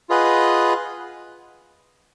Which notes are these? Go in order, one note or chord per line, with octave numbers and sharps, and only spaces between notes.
F4 G#4 B4 D#5 F#5